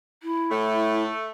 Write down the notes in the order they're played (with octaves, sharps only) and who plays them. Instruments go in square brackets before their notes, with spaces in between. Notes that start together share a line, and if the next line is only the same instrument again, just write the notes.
[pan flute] E4
[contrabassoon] A2 [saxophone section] A3